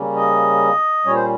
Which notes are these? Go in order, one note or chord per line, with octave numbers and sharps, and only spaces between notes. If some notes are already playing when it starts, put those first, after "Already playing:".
Already playing: C#3 G3 A#3 C#4
D#5
A#2 G3 C#4 C#5
C5